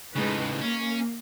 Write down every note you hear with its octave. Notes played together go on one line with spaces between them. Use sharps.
A2 C#3 G#3 D#4 B4
A#3 C#4